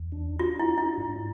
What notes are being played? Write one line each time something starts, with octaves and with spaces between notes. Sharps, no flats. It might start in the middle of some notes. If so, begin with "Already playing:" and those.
Already playing: E2
D4
D4 F4
E4
D4
E4
G#2